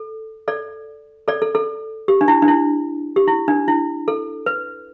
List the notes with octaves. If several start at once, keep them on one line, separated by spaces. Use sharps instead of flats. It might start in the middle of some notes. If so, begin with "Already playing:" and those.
Already playing: A4
A4 D5
A4 D5
A4
A4
G4
D4
E4
D4
E4
G4
E4
D4
E4
A4
B4